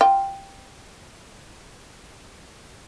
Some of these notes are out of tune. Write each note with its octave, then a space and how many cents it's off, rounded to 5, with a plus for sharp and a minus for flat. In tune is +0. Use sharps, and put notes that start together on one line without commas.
F4 +0 G5 +0